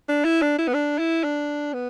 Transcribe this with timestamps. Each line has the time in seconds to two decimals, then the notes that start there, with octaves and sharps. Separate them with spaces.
0.09 D4
0.24 E4
0.42 D4
0.58 E4
0.68 B3
0.74 D4
0.98 E4
1.23 D4
1.73 B3